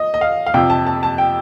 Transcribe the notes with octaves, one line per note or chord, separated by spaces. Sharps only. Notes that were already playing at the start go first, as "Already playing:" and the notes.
Already playing: D#5
D#5
F5
F5
F2 C3 F3 G5
A5
A5
A5
G5